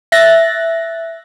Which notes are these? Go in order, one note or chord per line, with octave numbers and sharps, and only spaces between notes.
E5 F#6 A6 A#6